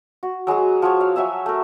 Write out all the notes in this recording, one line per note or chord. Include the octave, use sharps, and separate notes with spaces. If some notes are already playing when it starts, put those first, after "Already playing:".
F#4
F#3 G#3 F#4 G#4
F3 F#3 C#5
F5
F#3 E5 G#5 E6
A3 A#4